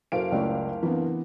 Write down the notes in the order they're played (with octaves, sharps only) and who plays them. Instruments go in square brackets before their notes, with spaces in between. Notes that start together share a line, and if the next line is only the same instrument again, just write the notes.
[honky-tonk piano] F#1 F5 D7 [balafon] F#4 A4 C5
[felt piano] C#2 D5 [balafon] A3 C#5 C#6
[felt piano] E3 B3 [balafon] C4 D4